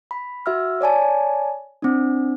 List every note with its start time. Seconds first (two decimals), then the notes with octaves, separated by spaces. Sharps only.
0.11 B5
0.46 F#4 E5 E6 F6
0.81 C#5 D5 G#5 A5
1.82 C4 D4